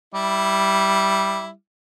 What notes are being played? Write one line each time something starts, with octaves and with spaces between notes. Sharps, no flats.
G3 E4